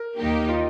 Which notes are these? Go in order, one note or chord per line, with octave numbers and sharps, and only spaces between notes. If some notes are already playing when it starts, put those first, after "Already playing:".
Already playing: A#4
D#2 D#3 A#3 D#4 G4
F4